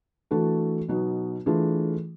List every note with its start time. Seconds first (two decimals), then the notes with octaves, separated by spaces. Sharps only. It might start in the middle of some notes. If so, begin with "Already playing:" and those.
0.31 E3 A3 D4 F#4 A4
0.88 B2 F#3 B3 D#4 F#4
1.46 E3 A3 D4 F4 G#4